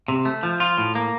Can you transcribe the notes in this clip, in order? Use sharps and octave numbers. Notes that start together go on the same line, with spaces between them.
C3
A3
F3
F4
A2
A#3